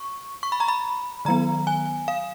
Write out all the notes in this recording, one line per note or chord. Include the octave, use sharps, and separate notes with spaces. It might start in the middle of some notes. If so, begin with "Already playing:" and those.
Already playing: C#6
C#6
B5
A#5
B5
D#3 F#3 B3 A#5
G#5
F5